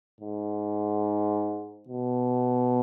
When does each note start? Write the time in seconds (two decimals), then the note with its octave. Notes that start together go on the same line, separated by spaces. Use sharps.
0.21 G#2
1.88 B2